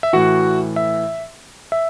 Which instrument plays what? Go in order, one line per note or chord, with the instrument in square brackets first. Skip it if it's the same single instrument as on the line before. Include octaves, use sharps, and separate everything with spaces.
[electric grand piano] E5
A2 E3 F#4 F#5
E5
E5